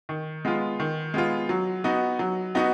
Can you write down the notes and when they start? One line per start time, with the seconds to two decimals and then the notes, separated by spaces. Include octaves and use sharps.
0.09 D#3
0.45 G#3 B3 F4
0.80 D#3
1.14 G#3 B3 F4
1.49 F#3
1.84 B3 D#4 F#4
2.19 F#3
2.55 B3 D#4 F#4